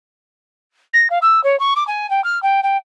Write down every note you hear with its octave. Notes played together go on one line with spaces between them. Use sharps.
A#6
F5
E6
C#5
C#6
D6
G#5
G5
F6
G5
G5